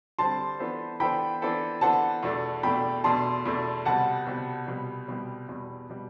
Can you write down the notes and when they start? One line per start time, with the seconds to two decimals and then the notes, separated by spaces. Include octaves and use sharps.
0.19 D3 G3 C4 A5 C6
0.59 E3 B3 D4 A4 C5
1.00 E3 B3 D4 A4 C5 G5 B5
1.42 E3 B3 D4 A4 C5
1.81 E3 B3 D4 A4 C5 F#5 A5
2.23 E2 B2 A3 D4
2.63 E2 B2 A3 D4 G5 B5
3.04 E2 B2 A3 D4 A5 C6
3.45 E2 B2 A3 D4
3.85 C2 B2 G3 F#5 A5
4.27 C2 B2 G3
4.67 C2 B2 G3
5.08 C2 B2 G3
5.48 E2 B2 G3
5.90 B2 G3